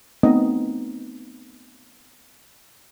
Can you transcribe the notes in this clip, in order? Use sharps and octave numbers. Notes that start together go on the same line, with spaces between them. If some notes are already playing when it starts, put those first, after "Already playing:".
A3 B3 C4 D#4 D#5